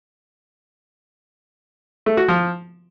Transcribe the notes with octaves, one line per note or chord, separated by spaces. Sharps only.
A3
F#4
F3